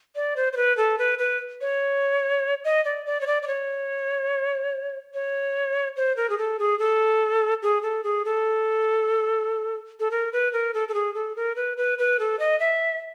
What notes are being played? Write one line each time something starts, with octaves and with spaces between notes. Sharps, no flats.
D5
C5
C5
B4
A4
B4
B4
C#5
D#5
D5
D5
C#5
D5
D5
C#5
C#5
C5
A#4
G#4
A4
G#4
A4
G#4
A4
G#4
A4
A4
A#4
B4
A#4
A4
A4
G#4
A4
A#4
B4
B4
B4
A4
D#5
E5